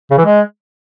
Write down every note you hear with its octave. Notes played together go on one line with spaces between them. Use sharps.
C#3
E3
G#3